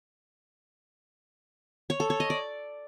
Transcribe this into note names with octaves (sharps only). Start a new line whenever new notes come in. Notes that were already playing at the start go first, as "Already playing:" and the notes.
C#5
A4
C#5
D#5
D5